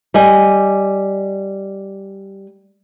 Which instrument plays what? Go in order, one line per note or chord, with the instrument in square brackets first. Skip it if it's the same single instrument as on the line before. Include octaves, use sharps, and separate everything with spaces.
[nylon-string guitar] G3 D#5 G#5